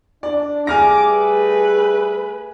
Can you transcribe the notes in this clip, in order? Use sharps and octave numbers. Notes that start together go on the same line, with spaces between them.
D4 D5
G3 A3 G#4 G#5 D6 F6 A#6
B4